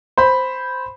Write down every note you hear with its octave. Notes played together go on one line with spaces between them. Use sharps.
C5 B5